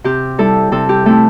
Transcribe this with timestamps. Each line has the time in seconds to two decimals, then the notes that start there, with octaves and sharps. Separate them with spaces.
0.04 C3 G4
0.38 G3 E4 A4
0.72 C3 A4
0.89 G4
1.06 A3 C4 E4 A4